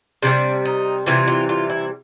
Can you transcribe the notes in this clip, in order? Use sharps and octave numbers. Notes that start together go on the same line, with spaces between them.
C3 E3 G3 D4
D#4
C3 E3 G3 F4
F4
F4
E4